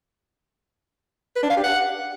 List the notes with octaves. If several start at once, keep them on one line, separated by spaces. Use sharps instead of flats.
B4
D4
F5
G4
F#5